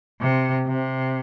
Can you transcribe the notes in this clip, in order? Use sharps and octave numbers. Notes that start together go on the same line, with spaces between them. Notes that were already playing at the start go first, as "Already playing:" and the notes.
C3
C3